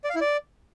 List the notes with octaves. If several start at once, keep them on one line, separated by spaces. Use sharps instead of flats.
D5
F5
E4
D5